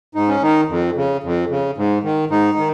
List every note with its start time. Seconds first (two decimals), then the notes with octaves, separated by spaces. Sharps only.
0.15 G#2 D#4
0.28 C#4
0.42 D#3 D#4
0.69 F2
0.96 C#3
1.23 F2
1.50 C#3
1.77 G#2
2.04 D#3
2.30 G#2 D#4
2.58 D#3